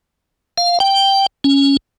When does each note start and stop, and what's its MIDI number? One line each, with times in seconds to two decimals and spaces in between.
0.58 0.79 77
0.80 1.26 79
1.44 1.77 61